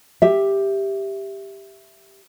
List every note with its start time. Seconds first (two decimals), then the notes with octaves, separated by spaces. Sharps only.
0.22 G4 E5